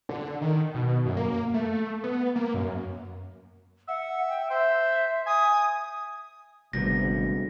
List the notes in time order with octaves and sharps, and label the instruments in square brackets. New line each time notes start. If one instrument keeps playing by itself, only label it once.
[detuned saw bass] D3
D#3
B2
F#2
A#3
A3
B3
A#3
F#2
[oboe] E5 [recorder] F#5
[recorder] G5
[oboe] C5 [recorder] E5
[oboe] G#5 [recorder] D#6
[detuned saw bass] G#1 [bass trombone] D2 [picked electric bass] C3 G3 B3 [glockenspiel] A#6